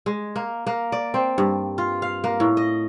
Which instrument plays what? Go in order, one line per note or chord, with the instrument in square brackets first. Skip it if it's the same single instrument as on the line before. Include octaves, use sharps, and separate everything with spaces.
[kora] G#3
A#3
A#3
D5
C4
G2
F4
F5
A#3
A2
D#5